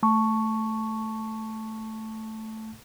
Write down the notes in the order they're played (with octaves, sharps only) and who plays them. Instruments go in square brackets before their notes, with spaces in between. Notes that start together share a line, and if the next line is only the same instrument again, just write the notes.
[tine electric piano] A3 A5 C#6